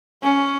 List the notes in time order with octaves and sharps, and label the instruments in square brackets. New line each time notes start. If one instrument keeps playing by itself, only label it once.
[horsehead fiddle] C#4